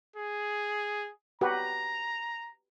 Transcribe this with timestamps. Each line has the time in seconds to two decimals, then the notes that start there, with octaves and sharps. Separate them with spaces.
0.16 G#4
1.41 F#4 G4 B4 A#5